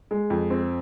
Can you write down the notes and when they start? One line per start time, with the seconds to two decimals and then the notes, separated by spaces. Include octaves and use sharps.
0.11 G#3
0.30 F2
0.50 C4